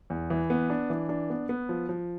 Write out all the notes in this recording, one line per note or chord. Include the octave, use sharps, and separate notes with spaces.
E2
E3
B3
D4
E3
D4
B3
B3
F3
F3